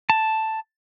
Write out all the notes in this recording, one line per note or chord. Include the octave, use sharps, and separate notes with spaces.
A5